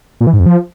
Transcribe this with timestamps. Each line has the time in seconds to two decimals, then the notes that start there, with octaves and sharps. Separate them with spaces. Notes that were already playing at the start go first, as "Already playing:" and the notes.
0.21 A#2
0.27 E3
0.33 G#2
0.40 F2
0.46 F3